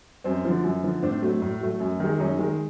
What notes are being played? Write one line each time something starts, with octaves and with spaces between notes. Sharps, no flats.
F#2 C4
D3 F3
F#2
D3 F3
A2 C4 D4
F#3 A3
A2
F#3 A3
F#2
D#3 G#3
F#2 C#4 D#4
D#3 G#3